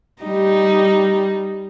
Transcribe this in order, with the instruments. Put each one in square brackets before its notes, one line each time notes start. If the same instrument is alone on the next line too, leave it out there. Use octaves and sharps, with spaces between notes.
[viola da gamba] G3 D#4